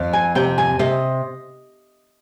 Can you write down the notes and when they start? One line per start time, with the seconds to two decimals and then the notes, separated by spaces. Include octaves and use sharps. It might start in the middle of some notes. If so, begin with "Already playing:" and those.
Already playing: F2
0.13 G#5
0.35 C3 G5
0.58 G#5
0.79 C3 D#5